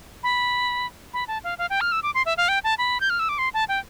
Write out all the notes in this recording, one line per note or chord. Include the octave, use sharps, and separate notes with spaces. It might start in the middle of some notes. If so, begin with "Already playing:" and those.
B5
B5
A5
F5
F5
G5
F6
E6
D6
C6
E5
F5
G5
A5
B5
G6
F6
E6
D6
C6
A5
G5